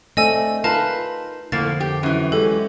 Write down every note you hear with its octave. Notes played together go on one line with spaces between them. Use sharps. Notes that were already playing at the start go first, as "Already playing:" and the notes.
A3 C4 D4 D#5 G#5 E6
D#4 F4 A#4 B4 F5 A5
F2 A2 D3 F3 A#3 A6
G4
F#2 E3
G#3 C#4 G4 A4